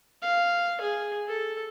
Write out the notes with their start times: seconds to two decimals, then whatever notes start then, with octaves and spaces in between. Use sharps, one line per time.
0.22 F5
0.81 G#4
1.28 A4